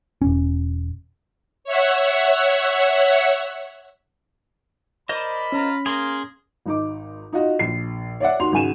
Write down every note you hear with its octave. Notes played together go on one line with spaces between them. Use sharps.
E1 C#4
C#5 E5 F#5
A#4 C5 D5 D#5 B5
C#4 F4 A#5
A#3 G#4 C6
G#1 D#4 D6
D#4 F4 F#4 D#5
A#1 C7
C#5 D5 E5 F#5
D#2 F#4 C6 F7
G#1 C#3 F#4 G#5 D#7 E7